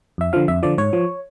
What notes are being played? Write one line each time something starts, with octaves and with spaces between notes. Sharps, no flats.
F2 E5
D3 F3 F5
F2 E5
D3 F3 D5
G#2 C#5
F3